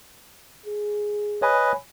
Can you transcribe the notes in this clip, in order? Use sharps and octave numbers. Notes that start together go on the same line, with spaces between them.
G#4
B4 C#5 D#5 G#5 B5